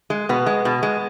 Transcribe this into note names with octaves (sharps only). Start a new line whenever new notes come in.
G#3
B2 B3
G#3
B2
G#3